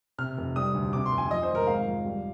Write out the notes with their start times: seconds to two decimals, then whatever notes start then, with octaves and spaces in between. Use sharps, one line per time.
0.18 C3 F6
0.38 F1
0.56 G3 D#6
0.74 D2
0.93 C3 D6
1.06 C6
1.12 F1
1.18 G#5
1.31 F3 D#5
1.43 C5
1.49 G#1
1.55 A#4
1.67 G#3 F5
1.86 F2
2.05 G3